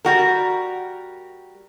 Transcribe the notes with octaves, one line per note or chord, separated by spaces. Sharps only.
G3 F#4 A#4